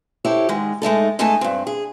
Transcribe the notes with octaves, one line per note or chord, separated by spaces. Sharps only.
E4 G4 A4 C5 C#5
G#2 D#3 G#3
G#3 A3 D#4 A4
G#3 A3 D#4 A4 G#5 A5
G2 C4
G#4